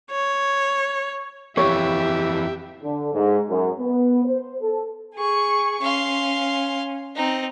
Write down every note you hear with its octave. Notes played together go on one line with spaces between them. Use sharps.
C#5
F2 E3 G4 C#5 E5
D3
G#2
F#2
B3
C5
A4
G#4 C#6
C#4 F5 C6
C4 D#4